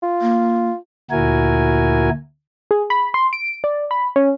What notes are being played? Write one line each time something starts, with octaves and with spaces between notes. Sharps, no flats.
F4
A#3
D2 A#2 E4 F#4 A#4 G#5
G#4
B5
C6
D7
D5
B5
C#4